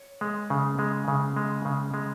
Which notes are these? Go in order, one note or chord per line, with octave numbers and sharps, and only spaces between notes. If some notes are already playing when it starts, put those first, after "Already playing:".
Already playing: C#5
G#3
C#3
G#3
C#3
G#3
C#3
G#3